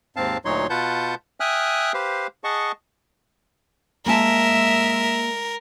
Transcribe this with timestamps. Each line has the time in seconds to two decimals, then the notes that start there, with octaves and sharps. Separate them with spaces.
0.16 D#2 G#2 C4 F5 A5
0.45 D2 A#2 F#3 D#4 C#5 C6
0.70 B2 F4 B4 F#5 A5 G6
1.40 E5 G5 G#5 D#6 F6 F#6
1.94 G4 B4 C5 F5
2.44 G#4 D#5 F#5 A5 C#6
4.06 G#3 A#3 A#4 E5 G#5 A5